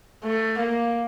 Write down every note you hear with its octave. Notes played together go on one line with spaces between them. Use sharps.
A3
A#3